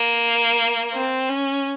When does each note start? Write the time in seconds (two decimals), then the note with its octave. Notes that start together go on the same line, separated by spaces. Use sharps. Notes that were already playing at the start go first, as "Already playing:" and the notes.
Already playing: A#3
0.93 C4
1.29 C#4